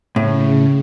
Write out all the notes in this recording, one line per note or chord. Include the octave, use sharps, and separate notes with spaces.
A2 C#3